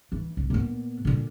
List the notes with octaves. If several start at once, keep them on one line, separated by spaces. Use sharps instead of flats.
E3
C2
A#2 B3
A#2 D3